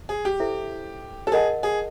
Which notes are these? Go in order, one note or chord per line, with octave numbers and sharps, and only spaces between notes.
G#4
G4
E4 A4 C5 E5
A4
G#4 A#4 D#5 F#5 A5
G#4